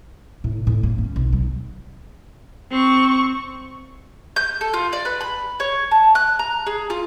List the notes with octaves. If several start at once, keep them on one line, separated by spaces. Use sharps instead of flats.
A2
A2
A#3
C#4
B1
F#3
C4 C#6
G6
A4
F4
D5
B4
B5
C#5
A5
F#6
A#5
G#4
F4